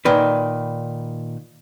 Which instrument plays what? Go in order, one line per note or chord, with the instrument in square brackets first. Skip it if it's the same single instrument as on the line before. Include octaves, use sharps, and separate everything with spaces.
[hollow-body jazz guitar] A#2 D#3 B4